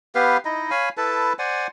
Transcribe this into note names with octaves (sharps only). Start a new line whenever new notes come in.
B3 G4 B4 F5
D#4 E4 D#5
C#5 F5 G#5 B5
E4 A4 B4 A5
C5 D5 F#5 G#5